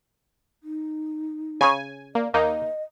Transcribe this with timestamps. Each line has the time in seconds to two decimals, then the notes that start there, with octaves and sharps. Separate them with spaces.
0.63 D#4
1.61 C#3 C#5 G#5
2.15 A#3 D5
2.34 D#2 A#3 D#4 D#5